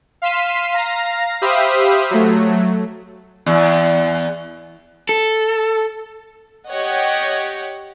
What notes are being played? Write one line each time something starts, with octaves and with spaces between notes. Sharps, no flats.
F5 C6 B6 D#7 E7
F5 A#5 A#6
G4 C5 E5 F5 B5 D#6
F#3 A3
E2
A4
G4 C#5 D#5 F#5